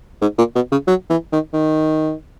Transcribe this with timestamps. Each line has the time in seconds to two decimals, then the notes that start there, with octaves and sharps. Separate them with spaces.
0.22 G#2
0.38 A#2
0.56 B2
0.72 C#3
0.88 F#3
1.10 E3
1.33 D#3
1.53 D#3